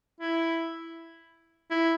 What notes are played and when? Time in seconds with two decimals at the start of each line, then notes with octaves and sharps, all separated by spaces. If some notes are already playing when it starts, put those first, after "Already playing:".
0.20 E4
1.71 E4